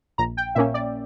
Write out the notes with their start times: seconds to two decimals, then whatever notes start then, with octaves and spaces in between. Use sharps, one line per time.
0.18 A#1 A#5
0.37 G5
0.55 A#2 A#3 C#4 E5
0.74 D5